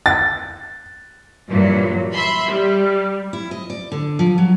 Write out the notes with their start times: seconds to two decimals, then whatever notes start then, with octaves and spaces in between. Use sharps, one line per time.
0.06 A6
1.49 G2 A#2 E3 F#3
2.13 E5 B5 C6
2.47 G3
3.33 E4
3.51 D#5
3.70 D5
3.92 D3
4.19 F3
4.38 F#3